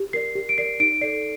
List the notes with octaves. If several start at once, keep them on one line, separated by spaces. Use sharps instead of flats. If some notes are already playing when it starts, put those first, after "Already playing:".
Already playing: G4
A#4 D5 C7
G4
D7
A#4 D5 C7
D#4 D7
A4 D5 C7